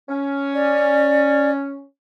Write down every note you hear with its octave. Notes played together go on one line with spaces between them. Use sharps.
C#4
D5